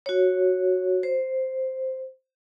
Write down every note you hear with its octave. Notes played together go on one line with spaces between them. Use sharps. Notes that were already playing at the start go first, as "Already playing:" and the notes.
F#4 C#5
C5